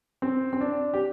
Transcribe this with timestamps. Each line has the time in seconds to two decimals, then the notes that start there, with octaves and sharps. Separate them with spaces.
0.22 C4
0.53 C4
0.60 D4
0.94 G4